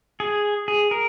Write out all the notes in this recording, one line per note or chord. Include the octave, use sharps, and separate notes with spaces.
G#4
G#4
A#4